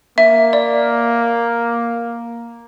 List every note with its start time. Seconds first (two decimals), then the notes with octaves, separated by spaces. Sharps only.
0.18 A#3 E5
0.53 D5